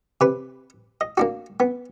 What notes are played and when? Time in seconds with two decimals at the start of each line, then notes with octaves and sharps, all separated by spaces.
0.21 C3 B4
1.01 D#5
1.17 A#3 D4 F#4
1.60 B3